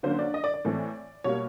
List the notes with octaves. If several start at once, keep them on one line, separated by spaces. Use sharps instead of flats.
D3 F#3 A#3 C#4 C5
D5
D#5
D5
D5
A2 E3 A3 C4
B2 G3 A#3 C#5